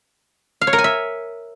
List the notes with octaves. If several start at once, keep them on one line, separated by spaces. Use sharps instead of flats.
F5
C#5
A#4
G#5
E5